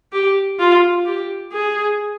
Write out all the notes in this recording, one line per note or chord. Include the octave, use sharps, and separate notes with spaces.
G4
F4
G4
G#4